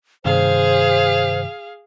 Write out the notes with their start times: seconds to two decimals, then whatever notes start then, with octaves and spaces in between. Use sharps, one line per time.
0.25 G2 C3 D#3 G#4 C5 F5